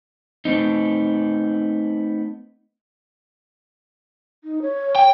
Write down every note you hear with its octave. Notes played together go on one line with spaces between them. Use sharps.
A3 B3 C4 D#4
D#4
C#5
G5